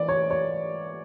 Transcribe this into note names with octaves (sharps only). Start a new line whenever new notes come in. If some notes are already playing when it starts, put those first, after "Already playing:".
Already playing: E3 D5
C#5
C#5